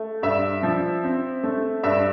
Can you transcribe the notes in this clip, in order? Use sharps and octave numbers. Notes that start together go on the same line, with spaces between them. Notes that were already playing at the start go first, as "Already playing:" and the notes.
Already playing: A3
G2 E5
F3
C4
A3
G2 E5